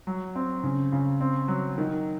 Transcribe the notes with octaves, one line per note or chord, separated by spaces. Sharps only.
F#3
C4
C#3
C#3
C4
F#3
D#3